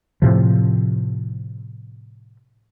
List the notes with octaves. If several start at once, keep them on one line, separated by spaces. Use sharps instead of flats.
A2 C3 F3